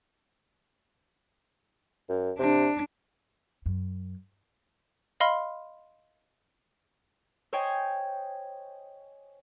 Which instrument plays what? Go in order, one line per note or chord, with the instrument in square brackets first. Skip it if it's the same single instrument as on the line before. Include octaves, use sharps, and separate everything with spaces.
[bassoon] F#2
[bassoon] C3 [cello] D4
[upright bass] F#2
[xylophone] D#5 F5 B5 C6 F6
[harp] C5 C#5 D#5 G5 G#5